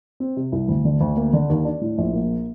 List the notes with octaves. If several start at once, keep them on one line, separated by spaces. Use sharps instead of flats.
C4
C3
C2
D2
D3
D2
A#3
D3
D#2
D4
A2
A#1
A#3